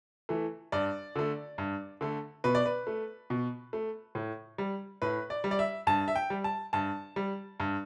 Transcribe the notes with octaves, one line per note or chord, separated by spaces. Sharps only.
E3 A3
G2 D5
D3 A3
G2
D3 A3
B2 B4
D5
B4
A3
B2
A3
A2
G3
A2 B4
D5
G3
D5
E5
G2 A5
E5
G5
G3
A5
G2 A5
G3
G2